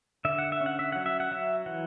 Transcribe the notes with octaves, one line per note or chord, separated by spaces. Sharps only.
D3 E5
F#5
E5
C#4
F#5
E5
F#3 F#5
E5
F#5
F#3 E5
E3 F#5